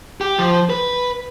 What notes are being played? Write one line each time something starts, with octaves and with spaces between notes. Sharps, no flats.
G4
F3
B4